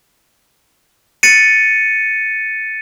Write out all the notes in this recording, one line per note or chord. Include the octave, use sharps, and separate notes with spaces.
A6 C#7 D#7